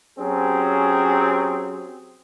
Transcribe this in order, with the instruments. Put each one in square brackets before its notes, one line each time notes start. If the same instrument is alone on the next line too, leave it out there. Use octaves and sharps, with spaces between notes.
[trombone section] F#3 C4 C#4 G4 G#4